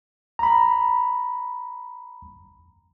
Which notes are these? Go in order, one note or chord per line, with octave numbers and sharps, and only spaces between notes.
A#5 B5